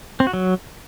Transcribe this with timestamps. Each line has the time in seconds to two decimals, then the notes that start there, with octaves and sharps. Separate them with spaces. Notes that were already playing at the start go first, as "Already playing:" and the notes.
0.20 C4
0.27 F#4
0.34 F#3